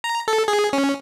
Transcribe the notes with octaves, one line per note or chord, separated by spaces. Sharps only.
A#5
A4
G#4
C#4